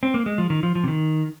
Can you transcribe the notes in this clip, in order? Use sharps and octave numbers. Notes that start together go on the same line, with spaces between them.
C4
A#3
G#3
F3
D#3
F3
F3
C3
D#3